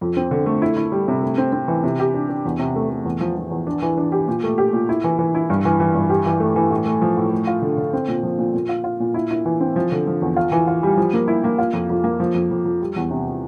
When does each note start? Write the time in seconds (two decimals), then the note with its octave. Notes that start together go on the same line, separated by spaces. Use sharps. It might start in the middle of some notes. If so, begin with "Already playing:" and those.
0.01 F2
0.17 C4
0.31 D3
0.46 A3
0.62 E4
0.76 E4
0.92 G3
1.08 C3
1.22 A3
1.38 C4
1.53 C4
1.68 E3
1.84 C3
1.99 G4
2.14 D4
2.29 D4
2.45 E2
2.59 C3
2.76 A3
2.90 A3
3.05 E2
3.20 F3
3.37 F3
3.51 E2
3.67 D4
3.82 E3
3.98 D4
4.12 G4
4.28 A#2
4.43 A3
4.58 G4
4.73 A#2
4.89 E4
5.04 E3
5.19 E3
5.35 E4
5.50 G2
5.65 E3
5.80 E3
5.95 G2
6.10 G4
6.26 E3
6.40 A3
6.56 E3
6.71 A2
6.86 A3
7.02 F3
7.17 A2
7.31 A3
7.47 F4
7.62 D3
7.77 D3
7.93 C4
8.08 A#2
8.23 F3
8.39 A#2
8.54 A#2
8.69 F4
8.84 F4
9.00 A#2
9.14 E4
9.31 E4
9.45 E3
9.61 C4
9.76 F3
9.92 D3
10.07 F3
10.21 E2
10.36 F4
10.52 E3
10.67 F4
10.83 G3
10.97 F3
11.14 A#3
11.28 E4
11.44 A#3
11.58 F4
11.73 F2
11.89 F2
12.04 A#3
12.20 F3
12.34 F2
12.51 F2
12.65 F2
12.81 G3
12.96 E2
13.11 C3